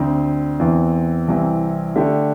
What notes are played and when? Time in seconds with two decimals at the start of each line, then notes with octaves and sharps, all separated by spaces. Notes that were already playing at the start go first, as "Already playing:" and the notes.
Already playing: D2 D3 C4
0.59 E2 E3 C4
1.28 C2 C3 E3 C4
1.95 D3 A3 D4 G4